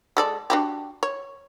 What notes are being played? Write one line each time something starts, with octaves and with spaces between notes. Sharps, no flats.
G#3 A4 D5
D4 F#4 G4
C#5